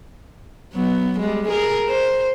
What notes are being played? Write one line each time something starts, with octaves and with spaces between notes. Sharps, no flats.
F#3 B3
G3 G#3
G#4 A#4
C5